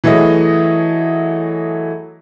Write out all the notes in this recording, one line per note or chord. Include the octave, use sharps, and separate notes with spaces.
E3 F#3 A3 G#4 D#5